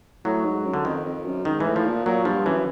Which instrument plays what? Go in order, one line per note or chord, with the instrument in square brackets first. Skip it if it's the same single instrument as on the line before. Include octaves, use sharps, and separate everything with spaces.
[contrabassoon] A2 [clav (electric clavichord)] F#3
[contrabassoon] G#2
F#2
[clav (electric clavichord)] D3
[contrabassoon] F2 [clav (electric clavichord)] D#3
[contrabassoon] F2
F#2
[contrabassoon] G#2 [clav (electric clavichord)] D#3
[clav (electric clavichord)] E3
[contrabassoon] A2
[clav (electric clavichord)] F3
[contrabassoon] A#2
[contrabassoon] A#2 [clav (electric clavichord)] F#3
[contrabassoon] G2 [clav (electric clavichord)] F3
[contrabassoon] F#2 [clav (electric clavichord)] E3